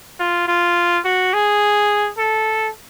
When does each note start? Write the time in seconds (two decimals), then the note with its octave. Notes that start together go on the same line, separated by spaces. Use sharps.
0.19 F4
0.48 F4
1.05 F#4
1.33 G#4
2.18 A4